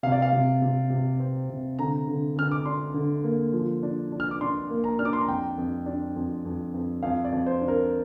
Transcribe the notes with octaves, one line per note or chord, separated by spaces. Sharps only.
C3 F5
D5
F5
C3
C3
C3
C4
C3
D3 A#5
D3
D3 F6
D6
D4 C6
D3
A#3
F3
D4
D4
F6
D6
D4 C6
A#3
A#5
D4 F6
D6
C6
A#5
F2 G5
F2
D4
F2
F2
F2
F2 F5
D5
F2
C5
D4
A#4